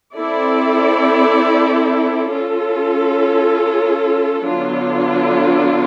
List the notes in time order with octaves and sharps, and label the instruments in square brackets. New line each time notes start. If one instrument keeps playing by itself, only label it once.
[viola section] C4 E4 A4 D5
C#4 F4 A4
D3 F#3 B3 D4 F4